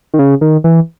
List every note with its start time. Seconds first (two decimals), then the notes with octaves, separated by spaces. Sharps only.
0.14 D#3
0.19 C#3
0.41 D#3
0.64 E3